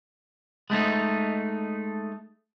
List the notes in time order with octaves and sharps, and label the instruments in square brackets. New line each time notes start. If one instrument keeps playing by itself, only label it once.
[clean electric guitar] G#3 A3 C#4 D#4